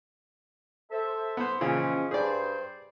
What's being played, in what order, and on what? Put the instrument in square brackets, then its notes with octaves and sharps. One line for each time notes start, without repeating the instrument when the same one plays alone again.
[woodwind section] A4 C5 E5
[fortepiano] B3 C5
[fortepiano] A#2 C#3 E3 [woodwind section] F3 G#3 C#4
[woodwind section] G2 C5 [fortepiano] G#4 D5